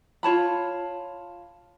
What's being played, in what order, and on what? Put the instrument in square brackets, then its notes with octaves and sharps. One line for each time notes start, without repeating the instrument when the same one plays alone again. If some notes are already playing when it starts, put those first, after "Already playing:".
[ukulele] F4 C#5 A5 B5